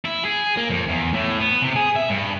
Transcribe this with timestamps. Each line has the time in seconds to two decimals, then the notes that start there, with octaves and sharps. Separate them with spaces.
0.05 E4
0.25 G#4
0.57 A#3
0.70 F2
0.88 E2
1.14 A2
1.40 B3
1.62 C3
1.76 G#4
1.96 E5
2.09 G2